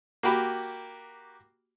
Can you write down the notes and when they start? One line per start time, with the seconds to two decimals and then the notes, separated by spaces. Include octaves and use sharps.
0.23 A#3 F#4 G4 B5